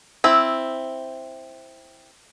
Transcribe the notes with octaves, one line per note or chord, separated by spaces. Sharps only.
C4 E4